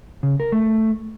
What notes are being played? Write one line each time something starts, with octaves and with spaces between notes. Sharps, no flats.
C#3
A#4
A3